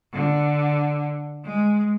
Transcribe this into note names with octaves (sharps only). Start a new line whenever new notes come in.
D3
G#3